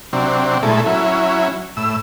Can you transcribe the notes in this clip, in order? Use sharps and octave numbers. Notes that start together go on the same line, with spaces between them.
C3 F#3 C4 D4
A#2 G#3 A3 E4 A4
F#3 C#4 E4
A2 E6